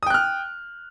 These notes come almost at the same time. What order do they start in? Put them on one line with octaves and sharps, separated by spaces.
D#6 G5 F#6 F6